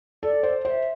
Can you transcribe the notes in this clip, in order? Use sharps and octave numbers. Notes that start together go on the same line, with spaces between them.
A4 D5
C5
C5 E5